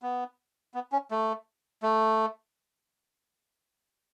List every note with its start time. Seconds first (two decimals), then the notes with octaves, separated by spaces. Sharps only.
0.02 B3
0.74 B3
0.92 C#4
1.11 A3
1.83 A3